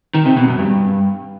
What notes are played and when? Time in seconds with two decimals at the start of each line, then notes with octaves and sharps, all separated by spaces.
0.14 D#3
0.26 C3
0.37 B2
0.48 F#2
0.59 G2